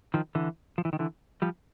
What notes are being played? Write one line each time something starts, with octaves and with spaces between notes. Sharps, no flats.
D#3 F3
D3 E3
F3
E3
D#3
D3 E3
F3 G3